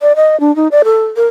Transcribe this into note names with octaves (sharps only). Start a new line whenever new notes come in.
D5
D#5
D4
D#4
D5
A4
A#4